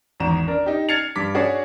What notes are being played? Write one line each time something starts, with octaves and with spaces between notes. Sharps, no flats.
G#1 E2 A#5 E7
D4 A#4
D#4 G4
F6 G#6 A6 C7 C#7 F7
G2 D6 B6
D4 F#4 G#4 C#5 D5